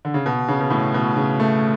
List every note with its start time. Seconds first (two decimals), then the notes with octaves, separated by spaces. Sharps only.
0.05 D3
0.14 C#3
0.26 B2
0.48 C#3
0.61 B2
0.71 A2
0.94 B2
1.16 C#3
1.40 A3